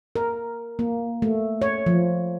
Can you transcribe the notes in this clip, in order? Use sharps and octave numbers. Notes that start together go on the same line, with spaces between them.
A#4
A#3
A3
C#5
F3